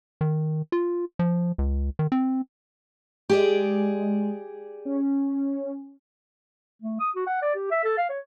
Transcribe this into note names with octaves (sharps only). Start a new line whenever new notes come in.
D#3
F4
F3
C#2
D#3
C4
G#3 G4 G#4 D5
C#4
A3
D#6
F#4
F#5
D5
G4
E5
A4
F5
C#5